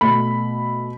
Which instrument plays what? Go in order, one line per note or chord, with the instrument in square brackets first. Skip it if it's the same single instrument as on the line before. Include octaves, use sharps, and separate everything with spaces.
[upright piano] B2 A3 B5